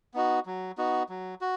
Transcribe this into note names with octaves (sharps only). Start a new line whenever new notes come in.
B3 D#4 F#4
F#3
B3 D#4 F#4
F#3
F#4